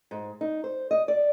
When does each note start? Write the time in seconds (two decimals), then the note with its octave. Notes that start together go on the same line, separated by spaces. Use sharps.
0.11 G#2
0.41 D#4
0.64 C5
0.91 D#5
1.08 D5